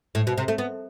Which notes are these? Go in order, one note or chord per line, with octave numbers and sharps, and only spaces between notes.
A2
B2
C3
A3
B3